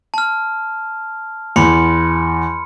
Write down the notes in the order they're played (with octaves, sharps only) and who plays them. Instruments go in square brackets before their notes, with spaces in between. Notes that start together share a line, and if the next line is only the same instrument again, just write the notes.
[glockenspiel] A5 F6
[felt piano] E2 [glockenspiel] B5 C6 C#7